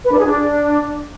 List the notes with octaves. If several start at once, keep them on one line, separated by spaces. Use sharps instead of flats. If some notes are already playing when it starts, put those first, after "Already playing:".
B4
D4
G#4
D4